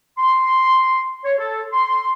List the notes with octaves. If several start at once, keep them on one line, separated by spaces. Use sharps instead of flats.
C6
C#5
A4
C6